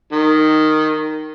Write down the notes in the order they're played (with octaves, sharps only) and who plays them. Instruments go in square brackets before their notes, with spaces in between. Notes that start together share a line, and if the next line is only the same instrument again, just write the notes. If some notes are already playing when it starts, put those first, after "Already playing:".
[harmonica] D#3